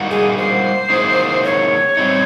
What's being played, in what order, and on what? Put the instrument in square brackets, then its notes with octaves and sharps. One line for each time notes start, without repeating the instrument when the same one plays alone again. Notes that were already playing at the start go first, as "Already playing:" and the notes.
Already playing: [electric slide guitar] G3 A#3 D#4 F#4
[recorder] G#4
C5
[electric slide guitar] F#3 A#3 D#4 G#4
[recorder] C#5
[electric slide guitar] G3 C4 D#4